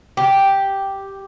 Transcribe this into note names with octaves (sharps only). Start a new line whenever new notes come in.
G4